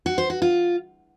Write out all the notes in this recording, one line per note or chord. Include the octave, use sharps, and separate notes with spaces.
F#4
C5
F#4
F4